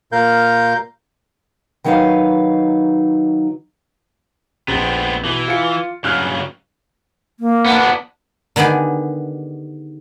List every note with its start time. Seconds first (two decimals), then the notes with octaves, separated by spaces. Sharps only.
0.12 A#2 A#4 F5 G6
1.84 D#3 F#3 D#4 B4 F5
4.68 A#1 F2 B3 C4
5.25 B2 E3
5.48 F4 C#7
6.04 G2 C#3 F#3 F6 F#6
7.40 A#3
7.65 B3 D4
8.56 D3 D#3 B3 G4 G#4